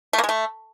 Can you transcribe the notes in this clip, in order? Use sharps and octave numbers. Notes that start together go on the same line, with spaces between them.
A3
A#3
G#3
A3